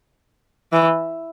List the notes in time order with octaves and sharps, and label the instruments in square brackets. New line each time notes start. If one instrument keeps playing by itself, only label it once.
[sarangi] E3